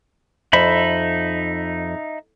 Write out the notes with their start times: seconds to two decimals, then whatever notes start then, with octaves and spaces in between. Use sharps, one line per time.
0.53 F2 D#4 E5 B5